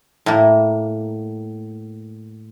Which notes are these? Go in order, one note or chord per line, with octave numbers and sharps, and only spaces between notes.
A2 A#3